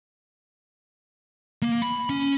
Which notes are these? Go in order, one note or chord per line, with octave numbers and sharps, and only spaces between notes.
A#3
B5
C#4